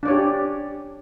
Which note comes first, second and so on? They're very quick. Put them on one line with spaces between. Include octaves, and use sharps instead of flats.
D4 D5 C#5 G4